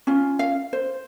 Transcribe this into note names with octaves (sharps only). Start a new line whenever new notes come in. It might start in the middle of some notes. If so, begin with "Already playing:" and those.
C#4 F4
F5
C5